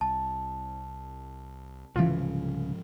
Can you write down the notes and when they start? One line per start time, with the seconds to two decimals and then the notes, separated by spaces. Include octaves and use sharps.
0.01 C2 A5
1.96 C2 G#2 C#3 E3 F3 F4